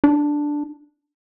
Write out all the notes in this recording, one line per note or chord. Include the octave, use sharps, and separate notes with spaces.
D4